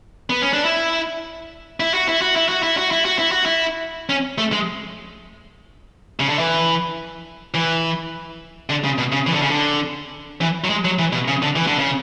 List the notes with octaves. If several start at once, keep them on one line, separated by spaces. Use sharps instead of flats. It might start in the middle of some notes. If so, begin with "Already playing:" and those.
B3
C#4
D4
E4
E4
F#4
E4
F#4
E4
F#4
E4
F#4
E4
F#4
E4
F#4
E4
C#4
A3
G#3
C#3
D3
E3
E3
D3
C#3
B2
C#3
E3
D3
C#3
D3
E3
F#3
G#3
F#3
E3
B2
C#3
D3
E3
D3
C#3